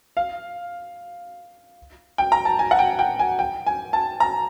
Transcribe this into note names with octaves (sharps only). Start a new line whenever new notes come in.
F5
G5
A#5
A5
G#5
F#5
G5
G5
G#5
G5
G#5
A5
A#5